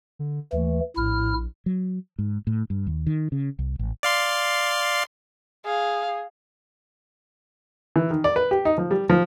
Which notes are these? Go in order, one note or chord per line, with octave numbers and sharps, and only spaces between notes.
D3
D#2 E3 A3
A#1 A2 E4 F6
F#3
G#2
A2
G2
D#2
D#3
C#3
C2
A1
D5 F5 C6
G#4 F5
E3
D#3
D5
B4
G4
D#4
F3
G3
F3